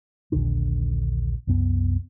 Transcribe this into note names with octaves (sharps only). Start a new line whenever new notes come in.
A#1 D#2 D3 D4
C2 F#2 B3